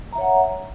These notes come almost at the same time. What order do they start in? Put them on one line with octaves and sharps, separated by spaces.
A#5 E5 C#5 F#5